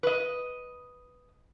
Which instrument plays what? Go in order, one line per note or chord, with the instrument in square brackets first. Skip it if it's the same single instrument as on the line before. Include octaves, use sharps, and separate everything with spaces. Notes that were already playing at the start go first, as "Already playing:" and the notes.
[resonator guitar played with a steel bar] B4 D#5